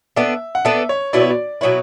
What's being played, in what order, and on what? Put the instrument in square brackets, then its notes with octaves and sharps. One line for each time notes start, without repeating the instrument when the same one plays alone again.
[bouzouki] B3 D4 A4 [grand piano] E5
[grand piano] F#5
[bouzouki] B3 D4 A4 [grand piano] E5
[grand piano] C#5
[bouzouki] B2 F#3 B3 E4 [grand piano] D5
[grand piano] C#5
D5
[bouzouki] B2 F#3 B3 E4 [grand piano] C#5